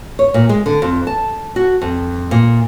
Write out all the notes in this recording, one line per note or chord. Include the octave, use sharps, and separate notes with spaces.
C#5
A#2
G#3
D3
F2
A5
F#4
F2
A#2